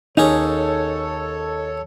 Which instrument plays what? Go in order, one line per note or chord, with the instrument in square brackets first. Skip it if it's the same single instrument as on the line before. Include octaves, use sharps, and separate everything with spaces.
[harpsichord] D#2 C#4 G#4 [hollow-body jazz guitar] D#4 [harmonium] A4 C#5